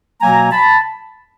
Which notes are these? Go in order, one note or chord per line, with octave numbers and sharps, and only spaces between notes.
B2 F#3 A#3 G#5 A#5
A5 B5